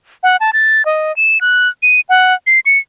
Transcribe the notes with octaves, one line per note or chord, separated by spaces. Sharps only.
F#5
A5
A6
D#5
E7
F#6
D#7
F#5
C7
C#7